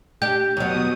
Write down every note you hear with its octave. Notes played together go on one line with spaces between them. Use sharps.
D4 G4 G6
D#2 B2 F#3 D#6